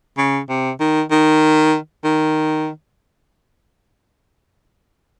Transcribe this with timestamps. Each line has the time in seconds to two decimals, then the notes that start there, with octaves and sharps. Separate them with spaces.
0.18 C#3
0.49 C3
0.80 D#3
1.11 D#3
2.04 D#3